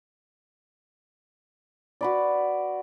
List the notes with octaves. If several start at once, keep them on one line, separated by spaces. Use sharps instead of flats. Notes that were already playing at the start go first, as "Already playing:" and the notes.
F#4 B4 D5